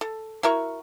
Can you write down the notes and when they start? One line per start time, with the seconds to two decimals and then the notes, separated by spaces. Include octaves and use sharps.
0.01 A4
0.43 E4 F#4 A#4 C#6